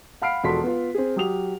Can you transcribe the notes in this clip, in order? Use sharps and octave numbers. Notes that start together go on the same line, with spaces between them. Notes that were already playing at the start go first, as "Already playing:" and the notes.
F5 F#5 B5 F6 C7 D7
E1 F3 F#4 A4 C6 B6
B3 F4
C4 G#4
F#3 G4 D#6 F7